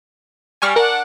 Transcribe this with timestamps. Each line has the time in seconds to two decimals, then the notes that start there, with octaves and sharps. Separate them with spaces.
0.62 G3 G#5 C#6 F6
0.76 D4 A#4 F#5